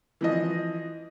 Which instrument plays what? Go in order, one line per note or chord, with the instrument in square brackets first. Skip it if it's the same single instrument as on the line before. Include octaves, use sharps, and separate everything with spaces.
[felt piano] E3 F3 D#5